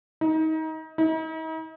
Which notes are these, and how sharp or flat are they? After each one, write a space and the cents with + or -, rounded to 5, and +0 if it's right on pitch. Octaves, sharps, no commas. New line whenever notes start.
D#4 +30
D#4 +45